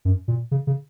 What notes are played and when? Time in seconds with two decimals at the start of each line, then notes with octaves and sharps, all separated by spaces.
0.05 F#2
0.28 A#2
0.51 C#3
0.67 C#3